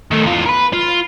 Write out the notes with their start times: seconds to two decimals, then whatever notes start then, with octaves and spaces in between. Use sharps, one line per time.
0.11 D#3 A3
0.24 E2 F4
0.46 A#4 B4
0.73 F4